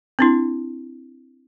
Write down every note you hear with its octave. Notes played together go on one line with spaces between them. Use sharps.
C4 D4 E4